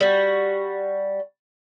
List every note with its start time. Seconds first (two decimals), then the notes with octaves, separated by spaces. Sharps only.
0.01 G3 F#4